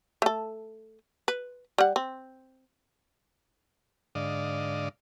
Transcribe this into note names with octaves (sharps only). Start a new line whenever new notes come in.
A3 A4
B4
G3 F#5
C4
G#2 D3 D5 D#5 F5